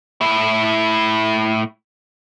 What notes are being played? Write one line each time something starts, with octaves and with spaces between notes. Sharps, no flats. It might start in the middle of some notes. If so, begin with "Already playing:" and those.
A2 E4